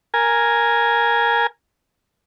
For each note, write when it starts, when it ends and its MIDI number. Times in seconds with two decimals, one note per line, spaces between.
0.14 1.47 70
0.14 1.47 80